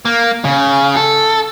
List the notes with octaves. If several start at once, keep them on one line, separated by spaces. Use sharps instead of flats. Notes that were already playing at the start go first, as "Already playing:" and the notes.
A#3
C#3
A4